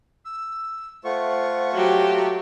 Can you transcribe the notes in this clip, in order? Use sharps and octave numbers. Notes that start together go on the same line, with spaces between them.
E6
A3 F4 C5 F#5 C#6
F#3 F#4 G4